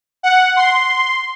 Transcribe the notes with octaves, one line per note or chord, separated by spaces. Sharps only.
F#5
C6